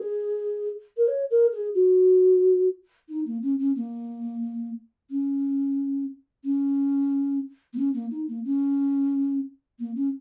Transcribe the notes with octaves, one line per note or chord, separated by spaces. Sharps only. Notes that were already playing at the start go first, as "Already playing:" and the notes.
Already playing: G#4
A#4
C#5
A#4
G#4
F#4
D#4
A#3
C#4
C#4
A#3
C#4
C#4
A#3
C#4
A#3
D#4
A#3
C#4
A#3
C#4